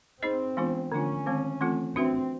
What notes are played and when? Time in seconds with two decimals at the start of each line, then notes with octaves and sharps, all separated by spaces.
0.23 C4 D#4 G#4 C5 D#5
0.57 E3 G#3 B3 D4 F4
0.92 D3 F3 A3 C#4 D4 F4
1.26 D#3 G#3 C4
1.61 E3 A3 C4 F4 A4
1.96 C4 D4 F#4 B4 E5